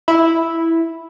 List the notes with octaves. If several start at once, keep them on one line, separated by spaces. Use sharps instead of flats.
E4